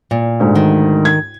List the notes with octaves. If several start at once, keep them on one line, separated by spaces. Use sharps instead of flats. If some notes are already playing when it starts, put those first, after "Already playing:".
A#2
D2 G#2
D#3
G#6